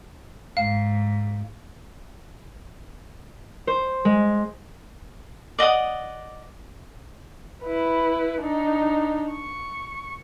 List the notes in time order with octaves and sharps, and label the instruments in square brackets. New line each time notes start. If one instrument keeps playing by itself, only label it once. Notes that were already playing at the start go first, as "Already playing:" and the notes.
[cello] G#2 [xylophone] F5
[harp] C5
G#3
[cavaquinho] D5 D#5 F#5 D#6
[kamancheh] E4 B4
D4 D#4
C#6